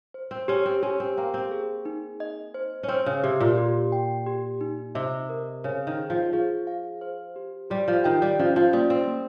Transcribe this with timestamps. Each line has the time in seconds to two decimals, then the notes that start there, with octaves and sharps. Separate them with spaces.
0.14 C5
0.31 C4
0.48 C#4 G4
0.65 C4
0.83 C#4 G4
1.00 C4
1.17 A#3 G5
1.34 C4
1.51 G#4
1.85 D#4
2.20 D#5
2.54 C5
2.83 C#4
2.89 C4 C5
3.06 C#3
3.24 C3 G4
3.40 A#2
3.58 G4
3.92 G5
4.26 G4
4.61 D#4
4.95 C3 D#5
5.29 A#4
5.64 C#3 C5
5.87 D#3
5.98 G#4
6.10 F3
6.33 F3 G#4
6.67 F5
7.01 C5
7.36 G4
7.70 G3 G4
7.88 F3
8.04 D#3 G5
8.22 G3
8.39 F3 C#4
8.56 F3
8.73 G3 A#3
8.90 C4
9.07 A#3